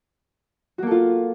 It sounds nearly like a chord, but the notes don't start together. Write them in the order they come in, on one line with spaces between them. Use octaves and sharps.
F#4 A#3 A4 F4